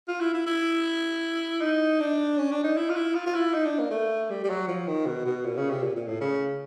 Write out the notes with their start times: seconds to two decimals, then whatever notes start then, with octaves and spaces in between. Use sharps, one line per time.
0.08 F4
0.21 E4
0.34 E4
0.47 E4
1.61 D#4
2.01 D4
2.38 C#4
2.51 D4
2.64 D#4
2.77 E4
2.90 F4
2.96 E4
3.15 F4
3.26 F4
3.35 E4
3.54 D#4
3.65 D4
3.79 A#3
3.91 A3
4.30 G3
4.44 G3
4.50 F#3
4.68 F3
4.87 D#3
5.06 B2
5.26 B2
5.45 A#2
5.57 C#3
5.71 C3
5.83 A#2
5.96 A#2
6.08 A2
6.21 C#3